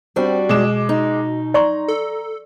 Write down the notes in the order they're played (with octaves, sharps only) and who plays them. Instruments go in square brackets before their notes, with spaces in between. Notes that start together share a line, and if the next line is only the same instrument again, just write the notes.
[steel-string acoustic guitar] G3 D4 F#4 [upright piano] C4
[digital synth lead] B2 [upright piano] G#3 D6 E7
[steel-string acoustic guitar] D#4
[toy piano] D5 C6 C#6 [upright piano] A#5
[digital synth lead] A4